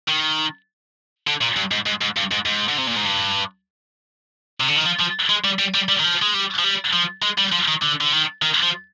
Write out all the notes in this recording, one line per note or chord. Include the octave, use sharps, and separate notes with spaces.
D#3
D3
A#2
G2
G#2
G#2
G#2
G2
G#2
G#2
D3
C3
A#2
G#2
G2
C3
D3
D#3
F3
F3
G#3
G3
G3
G3
G3
D#3
F3
G#3
G3
F3
G3
F3
G#3
G3
F3
D#3
D3
D3
D#3
D#3
F3